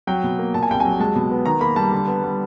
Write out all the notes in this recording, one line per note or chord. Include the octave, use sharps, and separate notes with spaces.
F#3 G5
B2
A#3
A#2 A5
G#5
C2 G5
F#3 G#5
G#3 A5
B2
B3
D#3 A#5
A#3 B5
G3 A5
D3
B3
G3